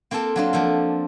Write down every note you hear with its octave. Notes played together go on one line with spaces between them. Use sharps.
A#3 C4 F4 A4 A5
F#3 D4 F4
F3 A#3 A4